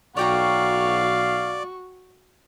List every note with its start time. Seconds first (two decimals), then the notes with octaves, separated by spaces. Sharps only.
0.17 B1 F#4 C#5 D5 F5 G5 A#5 C#6